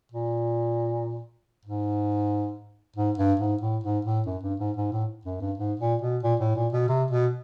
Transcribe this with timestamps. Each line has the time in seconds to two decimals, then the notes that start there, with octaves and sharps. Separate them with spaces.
0.12 A#2
1.65 G#2
2.96 G#2
3.18 G2
3.40 G#2
3.61 A2
3.84 G#2
4.05 A2
4.26 F#2
4.43 G2
4.60 G#2
4.77 G#2
4.93 A2
5.25 F#2
5.41 G2
5.58 G#2
5.79 A#2
6.02 B2
6.23 A#2
6.40 A2
6.56 A#2
6.73 B2
6.88 C3
7.11 B2